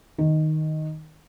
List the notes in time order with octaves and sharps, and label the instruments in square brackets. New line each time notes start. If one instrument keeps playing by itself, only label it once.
[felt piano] D#3